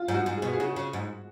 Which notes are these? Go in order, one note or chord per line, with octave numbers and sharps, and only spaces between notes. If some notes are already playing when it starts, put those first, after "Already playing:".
Already playing: F4
G#2
F#4
G#2
B2 G#4
G#4
C#3 F#4
C#3
G#2